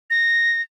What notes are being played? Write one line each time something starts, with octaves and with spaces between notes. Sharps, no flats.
A#6